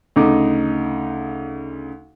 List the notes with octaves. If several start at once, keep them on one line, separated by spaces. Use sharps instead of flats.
D2 C#3 D#4 D6